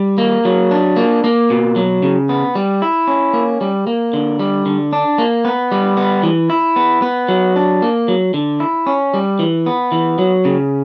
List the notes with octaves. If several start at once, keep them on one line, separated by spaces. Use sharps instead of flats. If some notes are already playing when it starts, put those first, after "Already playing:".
Already playing: G3
A#3
F#3
D4
A#3
A#3
B2
F#3
C#3
B3
G3
E4
C#4
A#3
G3
A#3
D3
G3
D3
D4
A#3
B3
G3
B3
E3
E4
B3
B3
F#3
D4
A#3
F#3
D3
E4
C#4
G3
E3
B3
E3
F#3
C#3